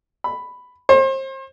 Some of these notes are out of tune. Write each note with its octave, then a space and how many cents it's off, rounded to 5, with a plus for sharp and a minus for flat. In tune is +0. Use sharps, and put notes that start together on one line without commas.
B5 +5
C5 +35